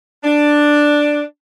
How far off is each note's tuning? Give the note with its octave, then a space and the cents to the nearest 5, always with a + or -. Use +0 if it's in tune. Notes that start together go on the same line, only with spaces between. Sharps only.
D4 +5